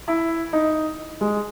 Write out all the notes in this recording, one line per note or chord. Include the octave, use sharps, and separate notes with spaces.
E4
D#4
G#3